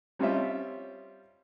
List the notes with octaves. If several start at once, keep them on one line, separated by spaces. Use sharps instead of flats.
G3 C4 C#4 F4 D#5 E5